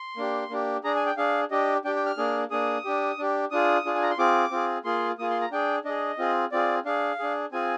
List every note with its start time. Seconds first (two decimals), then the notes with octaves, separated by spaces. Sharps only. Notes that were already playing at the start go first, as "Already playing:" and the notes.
Already playing: C6
0.17 A#3 D4 G4
0.50 A#3 D4 G4
0.84 D4 G#4 A#5
0.95 G#5
1.06 G5
1.17 D4 G#4 F5
1.51 D4 G4 D#5
1.85 D4 G4 G5
1.96 G5
2.06 F6
2.17 A#3 D4 G#4
2.51 A#3 D4 G#4 D#6
2.85 D4 G4
3.18 D4 G4
3.51 D4 F4 G#4 D#6
3.85 D4 F4 G#4
3.95 G#5
4.03 A#5
4.10 C6
4.18 C4 F4 G#4 D6
4.51 C4 F4 G#4
4.84 A#3 F4 G#4 C6
5.19 A#3 F4 G#4 D#6
5.30 C6
5.41 A#5
5.52 D4 G#4 G5
5.85 D4 G#4 D#5
6.19 C4 F4 G#4
6.52 C4 F4 G#4 D5
6.85 D4 G#4 F5
7.19 D4 G#4
7.52 C4 F4 G#4 G#5